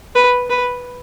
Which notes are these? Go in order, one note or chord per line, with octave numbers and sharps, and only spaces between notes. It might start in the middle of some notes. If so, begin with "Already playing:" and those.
B4
B4